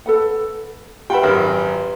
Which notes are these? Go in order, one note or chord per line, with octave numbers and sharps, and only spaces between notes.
A4 B4 F#5
F4 G4 B4 E5 F#5 G5 B5
G#1 F#2 A#4